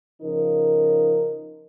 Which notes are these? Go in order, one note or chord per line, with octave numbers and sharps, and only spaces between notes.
C#3 F3 D#4 A#4